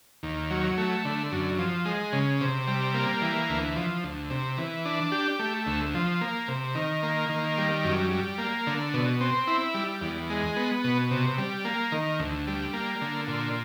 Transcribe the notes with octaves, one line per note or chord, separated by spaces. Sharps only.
D#2
F#3
A3
D3
F#2
F3
G#3
C#3
C3
G3
A#3
E3
D2
F3
D2
C3
E3
D4
G4
A3
D2
F3
A#3
C3
D#3
A#3
D#3
G3
F#2
G3
A#3
D3
B2
C4
E4
G3
E2
G#3
B3
B2
C3
G3
A#3
D#3
D2
G3
A#3
D3
A#2